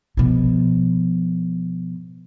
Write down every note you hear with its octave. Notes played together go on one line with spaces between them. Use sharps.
B2 F3